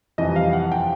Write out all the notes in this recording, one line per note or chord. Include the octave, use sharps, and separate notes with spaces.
F2 C3 E3 G3 D#5
F5
F#5
G5